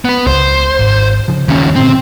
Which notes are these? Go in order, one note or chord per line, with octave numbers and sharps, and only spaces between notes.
B3 B4
C#2 C5
G#1
C#3 F3
D#2 C#3 F3 C#4
A#2 D3 F3 C4